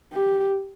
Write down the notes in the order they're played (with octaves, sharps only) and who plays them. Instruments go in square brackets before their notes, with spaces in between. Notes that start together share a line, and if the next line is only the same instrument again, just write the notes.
[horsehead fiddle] G4